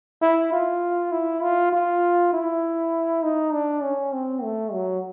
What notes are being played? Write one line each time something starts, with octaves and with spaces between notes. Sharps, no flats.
E4
F4
E4
F4
F4
E4
D#4
D4
C#4
C4
A3
F#3